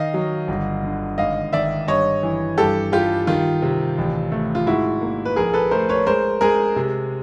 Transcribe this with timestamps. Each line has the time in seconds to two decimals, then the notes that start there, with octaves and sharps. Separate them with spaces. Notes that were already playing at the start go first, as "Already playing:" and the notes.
Already playing: D#3 D#5 F5
0.14 F#3
0.48 G1
0.83 D3
1.18 G#1 D#5 F5
1.53 D#3 D5 E5
1.88 G2 C#5 D#5
2.23 E3
2.58 G2 G4 A4
2.92 G3 F4 G4
3.27 D#3 F4
3.62 C3
3.98 A1
4.32 A3
4.55 F4
4.67 G#2 E4 F#4
5.02 A#3
5.25 B4
5.36 A#1 G#4 A#4
5.54 A4 B4
5.71 A3 A#4 C5
5.89 B4 C#5
6.06 G#3 A#4 C5
6.41 G#3 G#4 A#4
6.76 C3